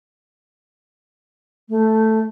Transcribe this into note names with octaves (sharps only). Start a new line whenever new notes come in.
A3